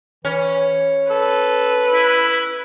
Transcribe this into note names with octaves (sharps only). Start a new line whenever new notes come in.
E3 C#4
A4 B4
E4